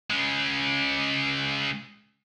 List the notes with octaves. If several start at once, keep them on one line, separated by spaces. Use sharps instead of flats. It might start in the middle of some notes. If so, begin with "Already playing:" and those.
C#3 G#3